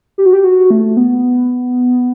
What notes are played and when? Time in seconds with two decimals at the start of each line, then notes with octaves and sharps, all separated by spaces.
0.18 G4
0.26 F#4
0.33 G4
0.44 F#4
0.70 A3
0.97 B3